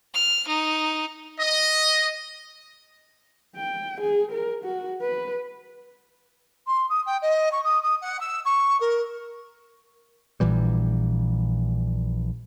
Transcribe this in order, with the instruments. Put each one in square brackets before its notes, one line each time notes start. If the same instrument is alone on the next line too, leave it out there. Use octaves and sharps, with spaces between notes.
[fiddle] F6
D#4
[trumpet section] D#5
[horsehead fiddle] G5
G#4
A#4
F#4
B4
[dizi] C6
D#6
G5
D#5
C#6
D#6
D#6
F#5
E6
C#6
A#4
[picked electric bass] A#1 A#2 E3 G3